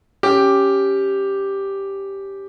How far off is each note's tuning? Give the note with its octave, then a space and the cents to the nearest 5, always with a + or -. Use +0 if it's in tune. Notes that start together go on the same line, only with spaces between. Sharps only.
C#4 +0 G4 +0